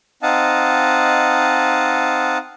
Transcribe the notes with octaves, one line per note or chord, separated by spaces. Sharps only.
C4 D#4 D#5 F5 F#5 A5